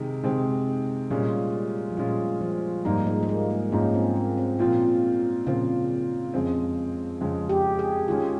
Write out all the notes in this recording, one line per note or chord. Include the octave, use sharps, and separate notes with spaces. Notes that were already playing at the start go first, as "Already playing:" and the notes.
Already playing: C3 D#3 G#3
C3 D#3 G#3 C4
A#2 G3 G#3 C#4 F4
F3
A#2 G3 G#3 C#4 F4
F3
G#2 F3 G3 A#3 D#4
G#3
G#3
A#3
A#3
G#2 F3 A#3 C#4 D#4
C4
A#3
C4
A#2 F3 A#3 C4 F4
A#2 C#3 F3 C4 F4
F2 C#3 G#3 C4
F2 C#3 G#3 C4
G4
G#4
D#3 G#3 C#4 F4